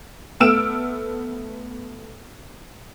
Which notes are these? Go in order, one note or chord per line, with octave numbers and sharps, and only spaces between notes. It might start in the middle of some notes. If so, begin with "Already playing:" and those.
A3 B3 E6 F6 D7 E7